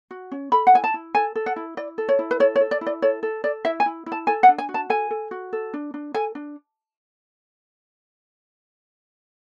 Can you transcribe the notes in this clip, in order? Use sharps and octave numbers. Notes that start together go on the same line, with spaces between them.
F#4
C#4
A4 B5
F#5
E4 G#5
A5
E4
A4 G#5
A4
F#5
E4
E4 D5
A4
C#5
E4
B4
A4 C#5
C#5
A4
D5
E4
D5
A4 C#5
A4
A4 D5
E4 E5
G#5
E4
E4
A5
A4 G#5
F#5
D4
G#5
F#4
A5
A4 G#5
A4
F#4
A4
D4
D4
A4 G#5
D4